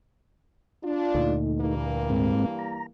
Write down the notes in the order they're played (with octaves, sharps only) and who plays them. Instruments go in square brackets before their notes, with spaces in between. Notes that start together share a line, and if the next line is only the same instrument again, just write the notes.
[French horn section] D4 F4
[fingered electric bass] D2 A#2 [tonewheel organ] A3 D#4
[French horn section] G2 E3 A#3
[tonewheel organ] G#2 G#3 C4
A#5